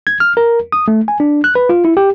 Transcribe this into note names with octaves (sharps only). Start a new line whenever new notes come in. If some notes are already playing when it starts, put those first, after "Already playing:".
G#6
F6
A#4
D#6
A3
G#5
D4
F#6
B4
F4
E4
G4